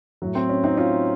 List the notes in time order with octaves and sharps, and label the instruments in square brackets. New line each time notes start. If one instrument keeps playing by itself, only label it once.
[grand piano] A2 F#3
C4
C#4
C4 D#4
C#4 F4